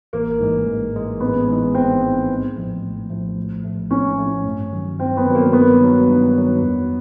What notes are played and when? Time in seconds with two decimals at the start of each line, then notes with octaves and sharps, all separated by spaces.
0.13 A1 A#3
0.40 G#2 E3 G#3
0.66 A1
0.94 G#2 E3 G#3
1.20 A1 B3
1.48 G#2 E3 G#3
1.74 A1 C4
2.02 G#2 E3 G#3
2.29 A#1
2.56 A2 F3 A3
2.83 A#1
3.10 A2 F3 A3
3.37 A#1
3.64 A2 F3 A3
3.91 A#1 C#4
4.18 A2 F3 A3
4.45 G2
4.72 D#3 F#3
4.99 G2 C4
5.17 B3
5.26 D#3 F#3
5.35 A#3
5.53 G2 B3
5.80 D#3 F#3
6.07 G2
6.33 D#3 F#3
6.61 F2